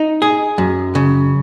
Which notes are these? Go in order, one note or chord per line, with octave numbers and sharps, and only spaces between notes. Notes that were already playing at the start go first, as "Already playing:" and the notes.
Already playing: D#4
G#4
F#2
C#3